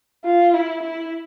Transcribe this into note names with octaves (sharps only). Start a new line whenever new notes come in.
F4
E4
E4